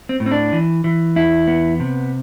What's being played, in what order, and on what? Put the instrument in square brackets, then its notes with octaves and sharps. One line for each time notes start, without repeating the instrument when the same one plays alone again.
[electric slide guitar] C4
A2
C4
D4
E3
E3
E2 E4
B3
C3